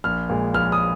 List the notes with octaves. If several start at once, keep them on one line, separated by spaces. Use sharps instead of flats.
A#1 F6
A#2 G#3
A#1 F6
D#6